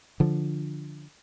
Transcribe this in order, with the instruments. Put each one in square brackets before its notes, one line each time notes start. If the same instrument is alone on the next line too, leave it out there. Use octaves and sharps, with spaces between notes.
[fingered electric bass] D3 F3